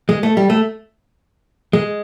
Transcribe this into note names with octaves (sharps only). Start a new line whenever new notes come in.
G#3
A3
G3
A3
G#3